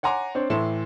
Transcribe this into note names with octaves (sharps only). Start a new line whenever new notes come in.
C#5 F#5 G#5 A#5 C6 D6
C4 D4 C5 C#5
A2 E3 A4 C6 E7